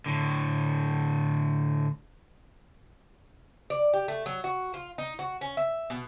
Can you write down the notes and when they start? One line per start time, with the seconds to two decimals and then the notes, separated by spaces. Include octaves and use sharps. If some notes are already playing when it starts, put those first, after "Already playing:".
0.06 A2 D3
3.70 D5
3.94 G4
4.08 A3
4.26 F#3
4.44 F#4
4.74 F4
4.98 D#4
5.19 F#4
5.41 C#4
5.57 E5
5.90 B2